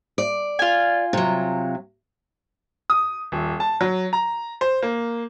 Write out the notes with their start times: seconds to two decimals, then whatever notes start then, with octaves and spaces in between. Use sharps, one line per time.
0.18 D5
0.59 F4 G#5
1.13 C3 F#3
2.90 D#6
3.32 D#1
3.60 A5
3.81 F#3
4.13 A#5
4.61 C5
4.82 A#3